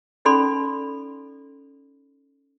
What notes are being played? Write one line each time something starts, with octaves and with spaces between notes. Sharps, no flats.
C#4 D#4 A4 D5 B5 C6